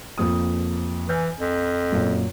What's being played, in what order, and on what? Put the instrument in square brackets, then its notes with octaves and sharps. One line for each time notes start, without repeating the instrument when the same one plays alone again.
[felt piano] F2 A#3 D#6
[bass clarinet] E3 [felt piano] G#5 F6 G6
[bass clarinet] F2
[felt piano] F#2 A#2